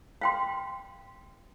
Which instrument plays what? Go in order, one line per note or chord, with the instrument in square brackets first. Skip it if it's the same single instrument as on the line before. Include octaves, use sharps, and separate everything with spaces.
[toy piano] F5 G5 C6